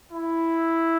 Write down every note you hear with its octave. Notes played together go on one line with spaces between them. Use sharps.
E4